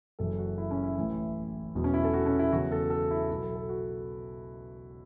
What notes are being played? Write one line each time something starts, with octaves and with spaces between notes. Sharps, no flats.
F#1 F#2 E3 A4
F#4
E4
C#4
E4
A1 A2 E3
E1 E2 B2 F#3
C#4
E4
A4
F#4
C#4
E4
E2 C#3 F#3 F#4
A4
A4
E4
B1 B2 F#3 E4
A4
A4
F#4